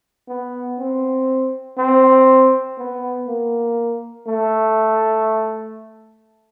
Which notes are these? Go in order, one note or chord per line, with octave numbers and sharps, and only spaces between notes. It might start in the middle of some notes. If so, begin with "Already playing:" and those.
B3
C4
C4
B3
A#3
A3